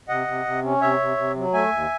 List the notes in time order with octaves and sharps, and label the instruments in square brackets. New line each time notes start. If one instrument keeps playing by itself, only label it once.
[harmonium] C3 D#5 F#5
C3
C3
C#4
C3 C#5 E5
C3
C3
F#3
A3 E5 G#5
D#2